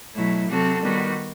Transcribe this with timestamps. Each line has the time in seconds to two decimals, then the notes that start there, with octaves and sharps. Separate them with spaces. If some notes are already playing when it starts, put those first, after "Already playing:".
0.15 B2 F#3 A3 E4
0.49 C3 F#3 C4 F#4 A4
0.83 D#3 G3 B3 F#4